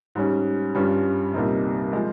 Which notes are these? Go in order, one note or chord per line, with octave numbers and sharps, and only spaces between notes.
G#2 G3 C#4
G2 G3 C#4 F4
C2 A#2 G3 C4 D#4
F3 G#3